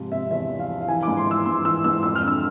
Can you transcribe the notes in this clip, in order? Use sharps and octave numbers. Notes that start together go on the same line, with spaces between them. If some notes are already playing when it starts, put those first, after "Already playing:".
Already playing: G#2 C3 F3
C3 E5
E2 E5
F3
F5
F3
F5
E3 G#5
G#2 D6
C6
E3 E6
G#2 C6
E3 E6
G#2 E6
F2 E6
F6
D3
E6